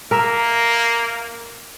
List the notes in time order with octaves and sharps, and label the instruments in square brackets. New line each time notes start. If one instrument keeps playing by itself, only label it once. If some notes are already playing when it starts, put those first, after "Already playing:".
[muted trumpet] A#3 [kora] A#4 E5